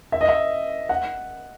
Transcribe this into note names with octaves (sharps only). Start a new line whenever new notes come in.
E5
D#5
E5
F#5